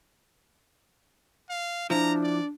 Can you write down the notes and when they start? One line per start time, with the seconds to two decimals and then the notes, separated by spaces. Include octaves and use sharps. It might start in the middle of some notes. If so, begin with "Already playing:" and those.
1.50 F5
1.90 F3 D4 E4 A#5
2.23 D5